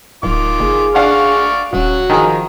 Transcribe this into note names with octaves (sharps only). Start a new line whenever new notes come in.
D1 D#3 F4 D6
F#1 G#4
D4 D5 F5 F#5 C#6 F6
D#1 F#3 C#4 F#4
D#3 F3 G#4 A#5